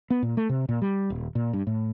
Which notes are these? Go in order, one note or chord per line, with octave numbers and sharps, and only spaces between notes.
B3
A#2
A3
C3
A#2
G3
D#1
A#2
G2
A2